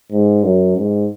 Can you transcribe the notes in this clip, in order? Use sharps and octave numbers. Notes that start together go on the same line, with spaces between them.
G#2
F#2
G#2